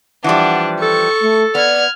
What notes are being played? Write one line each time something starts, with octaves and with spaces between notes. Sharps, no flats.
E3 F3 G3 D4 F#5
A4 C#6
A3
B3 D5 F6 G#6